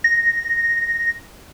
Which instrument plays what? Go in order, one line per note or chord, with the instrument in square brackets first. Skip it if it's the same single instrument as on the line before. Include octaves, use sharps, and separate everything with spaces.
[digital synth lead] A#6